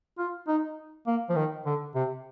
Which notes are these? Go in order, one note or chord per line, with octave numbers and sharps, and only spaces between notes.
F4
D#4
A#3
F3
D#3
D3
C3